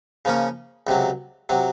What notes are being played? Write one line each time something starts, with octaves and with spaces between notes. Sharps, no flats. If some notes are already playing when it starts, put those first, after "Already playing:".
C#3 F3 A#3 C#4
C#2 C3 F#3
C3 F#3